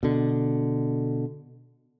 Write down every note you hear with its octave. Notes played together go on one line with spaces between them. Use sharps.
B2 D3